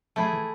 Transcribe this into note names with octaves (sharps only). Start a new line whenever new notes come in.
F3 A3 E4 G#4
E3